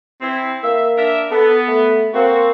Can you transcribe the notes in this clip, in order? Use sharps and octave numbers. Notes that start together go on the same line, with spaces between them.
C4 E4
A#3 E5
D4 A#4 E5
B3 A4
A3
A#3 C4 F#4